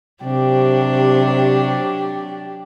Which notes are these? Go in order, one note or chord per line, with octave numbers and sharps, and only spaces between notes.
C3 F#3 D4 G4